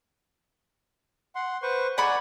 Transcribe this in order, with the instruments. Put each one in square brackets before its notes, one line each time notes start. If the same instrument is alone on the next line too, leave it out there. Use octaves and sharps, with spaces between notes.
[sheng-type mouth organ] F#5 C6
B4 C5 C#6
[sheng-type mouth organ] D5 G#5 [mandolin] F#5 B5 C#6